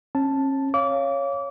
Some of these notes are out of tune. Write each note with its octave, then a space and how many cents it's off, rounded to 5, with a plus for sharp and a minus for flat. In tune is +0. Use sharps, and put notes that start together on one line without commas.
C#4 -35 A5 +0
C#5 +0 F5 -15 D6 -30